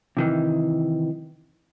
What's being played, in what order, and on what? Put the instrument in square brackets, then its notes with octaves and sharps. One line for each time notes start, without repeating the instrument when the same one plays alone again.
[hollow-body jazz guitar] C3 D#3 E3